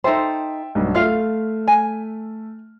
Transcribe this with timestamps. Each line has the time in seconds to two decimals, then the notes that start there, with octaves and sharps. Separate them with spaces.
0.04 D#4 A4 C5 E5 G5 C6
0.75 B1 G2
0.95 A3 F4 E5 F5 F6
1.68 G#5